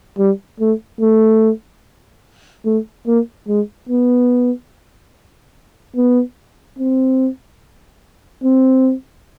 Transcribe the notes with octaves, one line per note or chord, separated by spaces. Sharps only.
G3
A3
A3
A3
A#3
G#3
B3
B3
C4
C4